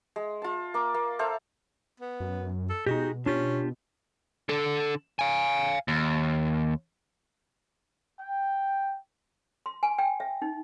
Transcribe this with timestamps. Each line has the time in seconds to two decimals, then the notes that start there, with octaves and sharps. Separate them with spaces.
0.16 G#3
0.42 F4 A5
0.74 A#3 D6
0.94 A#3
1.19 A4 C5 E5 F5
2.00 B3
2.20 F#2
2.69 A4
2.86 B2 G#3 D#4 F#4 G4
3.26 C#4 D4 F4 G4
4.49 D3 A4
5.19 F5 G#5
5.88 D#2
8.19 G5
9.66 C6
9.83 G#5
9.99 G5
10.20 E5
10.42 D#4